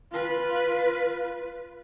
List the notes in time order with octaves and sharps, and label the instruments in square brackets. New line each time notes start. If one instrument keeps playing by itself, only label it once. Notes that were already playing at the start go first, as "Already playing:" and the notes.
[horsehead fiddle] F4 B4